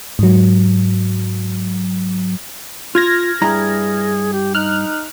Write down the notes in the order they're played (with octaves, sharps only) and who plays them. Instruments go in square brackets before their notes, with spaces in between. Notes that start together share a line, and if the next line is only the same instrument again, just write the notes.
[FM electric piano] G#2 F#3
[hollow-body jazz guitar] F4 [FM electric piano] F6 G#6 A#6
[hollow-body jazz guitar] G2 E4 A#5 [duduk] G#4
[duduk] G4
[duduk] D#4 [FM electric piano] F6 F#6